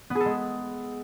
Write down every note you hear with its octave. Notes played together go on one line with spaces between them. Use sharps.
B3
G#4
A4
G#3